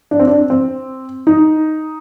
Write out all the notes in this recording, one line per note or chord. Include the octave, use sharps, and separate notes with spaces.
D4
C4
D4
C4
D#4